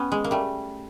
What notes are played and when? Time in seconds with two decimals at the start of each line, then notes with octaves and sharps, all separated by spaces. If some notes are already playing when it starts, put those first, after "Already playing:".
Already playing: B3 C#4
0.12 G#3
0.24 A#3
0.31 G3 A3